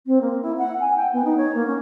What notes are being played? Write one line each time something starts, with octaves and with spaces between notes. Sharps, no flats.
C4
A#3
E4
F#5
G#5
G5
B3
D#4
C#5
A#3
C#4